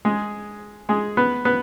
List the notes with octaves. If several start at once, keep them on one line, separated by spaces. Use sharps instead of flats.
G#3 G#4
G#3 G#4
B3 B4
B3 B4